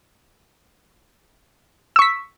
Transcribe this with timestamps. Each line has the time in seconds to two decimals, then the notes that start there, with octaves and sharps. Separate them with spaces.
1.96 E6
1.99 C#6
2.02 B6